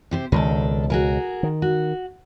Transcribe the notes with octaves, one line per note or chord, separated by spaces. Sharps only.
C3 G4 C5
C#2 B2 D#3 D4 A4
F#4 G#4 A#4
D#3
F#4